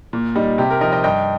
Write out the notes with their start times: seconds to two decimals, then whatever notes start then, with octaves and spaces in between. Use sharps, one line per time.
0.13 A#2
0.36 G3 D#4
0.58 C3 G4
0.70 A#4
0.81 F3 D#4 A#4 D#5
0.92 D#5 G5
1.04 G2 D#5 G5